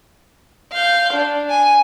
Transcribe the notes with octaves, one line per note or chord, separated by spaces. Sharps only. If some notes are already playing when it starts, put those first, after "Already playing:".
F5 G6
D4
G#5